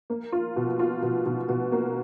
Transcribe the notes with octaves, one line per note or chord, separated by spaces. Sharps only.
A#3
F4
B2
F4
B2
B2
B2
A#3